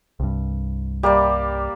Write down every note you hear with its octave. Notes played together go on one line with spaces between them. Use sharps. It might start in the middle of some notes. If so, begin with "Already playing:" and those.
C2 G2
G3 A#3 G4 D5